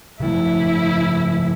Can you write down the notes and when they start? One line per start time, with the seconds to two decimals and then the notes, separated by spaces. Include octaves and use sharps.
0.20 C#3 F3 A3 E4